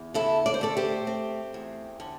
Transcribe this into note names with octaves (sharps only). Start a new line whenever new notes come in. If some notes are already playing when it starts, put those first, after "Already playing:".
Already playing: E2
D3 E4 A4
D5
C5
A3 A4 D5
G4 C5
C4
E2
D3